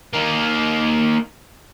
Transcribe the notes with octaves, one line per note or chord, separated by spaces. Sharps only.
A#3 D#4